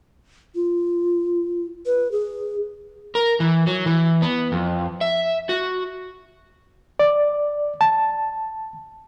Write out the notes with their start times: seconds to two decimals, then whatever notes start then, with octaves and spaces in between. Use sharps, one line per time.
0.55 F4
1.86 B4
2.12 G#4
3.15 A#4
3.40 E3
3.67 F#3
3.86 E3
4.22 B3
4.52 F2
5.01 E5
5.49 F#4
6.99 D5
7.81 A5